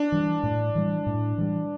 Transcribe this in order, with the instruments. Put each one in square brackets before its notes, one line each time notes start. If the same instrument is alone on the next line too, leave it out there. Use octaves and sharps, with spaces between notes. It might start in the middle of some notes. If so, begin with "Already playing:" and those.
Already playing: [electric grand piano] D4
[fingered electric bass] E3 G3
A2
E3 G3
A2
E3 G3